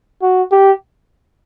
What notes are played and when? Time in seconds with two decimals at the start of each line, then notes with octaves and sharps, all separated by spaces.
0.22 F#4
0.52 G4